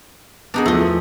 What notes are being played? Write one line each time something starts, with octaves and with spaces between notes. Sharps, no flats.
B3 D4 D#4 F#4 G#4
E2 F3 A3 D#5